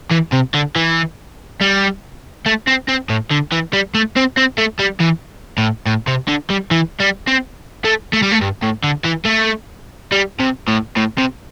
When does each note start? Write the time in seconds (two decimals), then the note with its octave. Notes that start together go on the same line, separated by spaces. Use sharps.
0.11 E3
0.33 C3
0.54 D3
0.76 E3
1.61 G3
2.46 A3
2.67 C4
2.88 C4
3.09 A2
3.31 D3
3.52 E3
3.73 G3
3.95 A3
4.16 C4
4.37 C4
4.58 A3
4.80 G3
5.00 E3
5.58 A2
5.86 A2
6.07 C3
6.28 D3
6.50 G3
6.71 E3
7.00 G3
7.27 C4
7.84 A3
8.13 A3
8.22 G3
8.32 A3
8.41 G2
8.62 A2
8.84 D3
9.05 E3
9.26 A3
10.12 G3
10.39 C3
10.68 A2
10.96 A2
11.18 C3